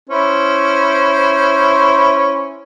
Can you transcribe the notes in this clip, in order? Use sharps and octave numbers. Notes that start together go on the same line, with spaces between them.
C#4 E4 C5